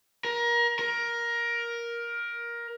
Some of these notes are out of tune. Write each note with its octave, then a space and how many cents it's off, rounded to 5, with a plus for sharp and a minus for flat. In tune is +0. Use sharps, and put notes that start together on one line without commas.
A#4 +25
A#4 +15